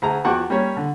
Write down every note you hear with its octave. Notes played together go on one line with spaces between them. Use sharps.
D2 G#4 A#5
E2 F3 F#4 F#5 G5 D6
G3 A#3 C#4 C#5
D3